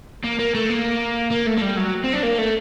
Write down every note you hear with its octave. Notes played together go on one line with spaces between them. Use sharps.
A#3
A#3
A3
A#3
A#3
A3
A3
G3
F#3
C4
D4
A#3
A3